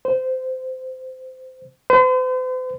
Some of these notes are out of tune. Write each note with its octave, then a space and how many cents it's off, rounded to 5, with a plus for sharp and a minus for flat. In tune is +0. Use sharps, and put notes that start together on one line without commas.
C5 -20
C5 -45